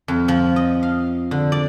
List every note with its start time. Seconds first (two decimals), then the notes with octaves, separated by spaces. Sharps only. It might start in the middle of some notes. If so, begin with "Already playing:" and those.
0.08 F2
0.28 F3
0.56 D#5
0.83 F5
1.31 D3
1.52 D5